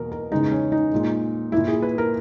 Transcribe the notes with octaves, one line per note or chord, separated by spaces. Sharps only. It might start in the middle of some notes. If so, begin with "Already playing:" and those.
Already playing: E2 B2 A#3 A#4
A#4
E2 C#3 G#3 D#4
C#4
D#4
A#2 G#3
A#2 A#3 E4
G#4
B4
A#4